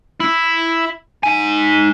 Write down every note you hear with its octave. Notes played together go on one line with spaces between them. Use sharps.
E4
D#4 G#5